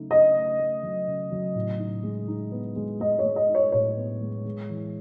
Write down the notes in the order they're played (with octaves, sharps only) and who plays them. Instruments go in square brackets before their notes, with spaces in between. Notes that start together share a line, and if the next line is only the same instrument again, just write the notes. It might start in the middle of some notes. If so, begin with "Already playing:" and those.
Already playing: [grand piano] C#3 F#3 A3 D#4
[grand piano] C#3 [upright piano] D#5
[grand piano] A3
A3
F#3
C#3
F#3
A2
D#4
G#3
D#4
B3
G#3
[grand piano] G#3 [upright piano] D#5
[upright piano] C#5
[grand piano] G#3
[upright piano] D#5
[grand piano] D#4
[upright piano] C#5
[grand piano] A2 [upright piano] C#5
[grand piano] B3
G#3
G#3
E3